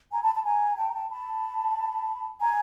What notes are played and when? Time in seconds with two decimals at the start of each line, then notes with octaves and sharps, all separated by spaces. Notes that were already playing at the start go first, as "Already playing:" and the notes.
0.12 G#5 A#5
0.23 A5 B5
0.34 A5 B5
0.44 G#5 A#5
0.77 G5 A5
0.88 A#5
0.94 G5 A5
1.09 A5 B5
2.40 G#5 A#5